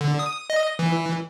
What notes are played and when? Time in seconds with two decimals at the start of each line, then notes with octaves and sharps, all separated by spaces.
0.01 D3
0.19 D#6
0.50 D#5
0.79 E3